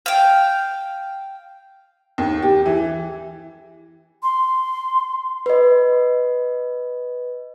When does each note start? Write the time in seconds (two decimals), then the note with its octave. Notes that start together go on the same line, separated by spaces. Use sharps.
0.06 F5 G5
2.18 D#2
2.42 G4
2.66 E3
4.23 C6
5.46 B4 D#5